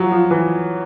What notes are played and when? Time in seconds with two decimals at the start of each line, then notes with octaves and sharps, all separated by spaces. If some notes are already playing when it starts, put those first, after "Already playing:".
Already playing: F3 F#3
0.12 F3
0.31 E3